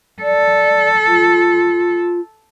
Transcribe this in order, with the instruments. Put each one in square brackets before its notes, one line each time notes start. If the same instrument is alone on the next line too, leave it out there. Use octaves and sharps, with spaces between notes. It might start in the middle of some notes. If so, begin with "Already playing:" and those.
[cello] A4 [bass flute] D5
[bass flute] F4